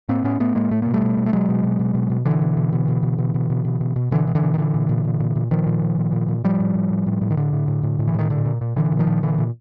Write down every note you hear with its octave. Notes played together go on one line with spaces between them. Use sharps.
A2 A#3 C4
A2 B3 C#4
A2 A3 B3
A2 G#3 A#3
A2 A3
B2 A#3
G3 A3
B2
B2
A3
B2 F#3 G#3
B2
B2
B2
B2
B2
B2 D3 E3
B2
B2
B2
B2
B2
B2
B2
B2
B2
B2
B2
B2 D3 E3
B2
D3 E3
B2
D#3
A#2 D3 E3
A#2
A#2
A#2
A#2
A#2
A#2 D#3 F3
A#2
A#2
A#2
A#2
A#2
A2 F3 G3
A2
A2
A2
A2
A2
D#3
A2 D3
A2
A2
A2
A2
E3
A2 D#3
A#2 D3
A#2
A#2
A#2 D3 E3
A#2
D#3 F3
A#2
A#2 D3 E3
A#2